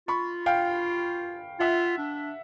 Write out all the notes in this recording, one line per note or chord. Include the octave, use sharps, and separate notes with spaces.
F4 B5 C#6
F5 G5
F4 E5 F#5
D4